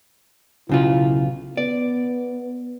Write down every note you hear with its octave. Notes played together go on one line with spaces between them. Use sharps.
B1 C#3 E4 F4
B3 D5